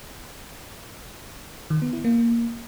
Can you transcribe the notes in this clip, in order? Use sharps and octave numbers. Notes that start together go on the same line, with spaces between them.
D#3
B3
E4
A#3